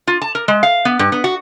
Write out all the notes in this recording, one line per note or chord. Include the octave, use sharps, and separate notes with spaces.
F4
A5
A#4
G#3
F5
B3
G2
B3
F#4